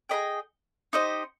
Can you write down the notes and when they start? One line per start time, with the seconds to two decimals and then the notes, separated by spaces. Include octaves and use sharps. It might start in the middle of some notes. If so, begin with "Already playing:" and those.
0.09 G#4 B4 D#5 G5
0.93 D#4 G4 C5 D#5